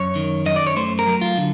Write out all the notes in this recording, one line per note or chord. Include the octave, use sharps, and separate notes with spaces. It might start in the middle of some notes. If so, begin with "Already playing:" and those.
Already playing: F#2 C#5
D#3
F#2 D#5
D5
C#5
A3 C5
A#4
F#3
F4
D3